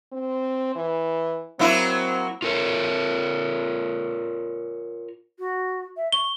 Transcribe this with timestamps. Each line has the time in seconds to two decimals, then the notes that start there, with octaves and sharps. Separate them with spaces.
0.12 C4
0.76 E3
1.59 F#3 A#3 C4 E4
2.42 F4 A#4 C#5
5.39 F#4
5.97 E5
6.12 C#6 G7